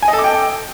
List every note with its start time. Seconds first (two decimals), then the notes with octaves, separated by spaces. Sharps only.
0.03 G#5
0.08 D#5
0.13 A4
0.19 D6
0.24 G5